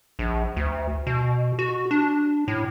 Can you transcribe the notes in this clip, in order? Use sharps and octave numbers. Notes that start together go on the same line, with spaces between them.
A#1
D2
B2
F#4
D4
A2